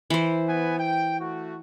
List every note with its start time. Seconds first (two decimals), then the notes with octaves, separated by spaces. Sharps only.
0.10 E3 C5
0.47 B3 B4 G#5
0.80 G5
1.20 A3 F#4